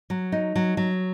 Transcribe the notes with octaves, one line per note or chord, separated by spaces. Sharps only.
F#3
D#4
F#3
F#3